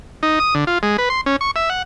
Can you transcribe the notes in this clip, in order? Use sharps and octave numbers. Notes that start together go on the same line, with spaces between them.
D#4
D#6
D3
F4
G#3
B4
C6
C#4
C#6
E5
F#5